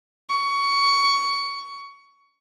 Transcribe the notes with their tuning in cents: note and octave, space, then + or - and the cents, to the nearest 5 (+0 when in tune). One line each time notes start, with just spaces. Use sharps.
C#6 +20